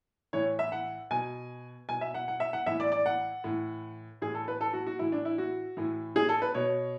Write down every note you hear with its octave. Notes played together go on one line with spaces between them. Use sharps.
A2 E3 C#5
E5
F#5
B2 G#5
B2 G#5
E5
F#5
F#5
E5
F#5
A2 E3 E5
D5
D5
F#5
A2 E3
A2 E3 G#4
A4
B4
A4
F#4
F#4
A2 E3 E4
D4
E4
F#4
A2 E3
G#4
A4
B4
B2 C#5